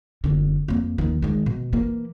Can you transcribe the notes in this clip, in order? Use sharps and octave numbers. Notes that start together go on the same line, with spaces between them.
F#1 D3
F2 A#3
D#2 D#3
D#3 G#3
B2
E3 A#3